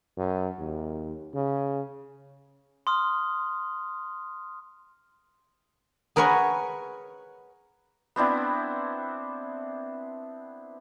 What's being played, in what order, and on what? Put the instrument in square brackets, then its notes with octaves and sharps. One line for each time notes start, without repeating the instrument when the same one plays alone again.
[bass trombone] F#2
D#2
C#3
[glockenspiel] C6 D#6 F6
[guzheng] G#4 A#4 B4 C#5 F#5 G#5
[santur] B3 C4 D4 E4